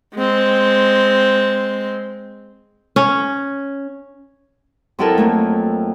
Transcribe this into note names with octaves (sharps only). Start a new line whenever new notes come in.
G#3 C4
C#4
F2 F#3 E4 F4 A4 A#4
A3 A#3